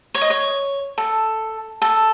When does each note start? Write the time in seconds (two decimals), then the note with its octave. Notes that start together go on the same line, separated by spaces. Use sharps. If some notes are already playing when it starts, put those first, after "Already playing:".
0.14 C#5
0.21 D#5
0.30 C#5
0.98 A4
1.82 A4